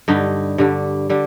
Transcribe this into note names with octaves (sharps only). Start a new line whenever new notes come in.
G2 D3 G3 D#4
G2 D3 G3
D3 G3